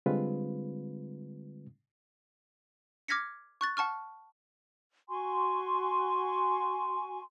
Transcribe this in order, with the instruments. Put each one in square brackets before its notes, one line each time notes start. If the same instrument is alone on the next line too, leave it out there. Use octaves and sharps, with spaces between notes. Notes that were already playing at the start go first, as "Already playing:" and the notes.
[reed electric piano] D3 G3 G#3 C4 F4 B4
[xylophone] D6 F6 G#6 A#6 B6 C#7
C#6 F#6 A6
F#5 A5 C#6 F6
[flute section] F#4 G#5 C6 C#6